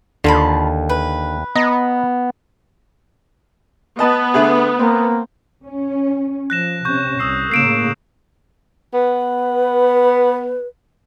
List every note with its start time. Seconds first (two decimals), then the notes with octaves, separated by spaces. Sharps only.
0.24 D#2 D3 F4 A5 B5
0.89 B4
1.55 B3 D#5 A#5
3.99 B3 D#5 A5
4.34 D3 A3 G#4
4.79 A#3 C4
5.64 C#4
6.50 F3 F#6 A#6 E7
6.85 C3 C#4 C#6 G6
7.19 C2 D#6 E6 C7
7.52 A2 C#3 A#3 C7 D7 E7
8.94 B3 B4